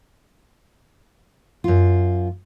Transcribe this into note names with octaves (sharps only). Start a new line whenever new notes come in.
F#2 F4